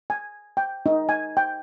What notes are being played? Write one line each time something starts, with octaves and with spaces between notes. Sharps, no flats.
G#5
G5
D#4
G#5
G5